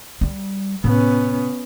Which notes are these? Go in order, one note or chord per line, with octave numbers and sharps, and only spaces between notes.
G3
A2 C3 B3 C#4